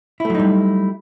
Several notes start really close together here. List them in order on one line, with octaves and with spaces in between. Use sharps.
E4 A3 F#3 D#4 G3